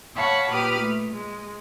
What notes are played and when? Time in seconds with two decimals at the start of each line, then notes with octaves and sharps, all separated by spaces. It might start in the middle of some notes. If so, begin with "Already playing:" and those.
0.16 C#5 F5 F#5 A5 B5 C#6
0.50 A#2 G4 B4 D6 D#6 F6
0.79 A3
1.10 G#3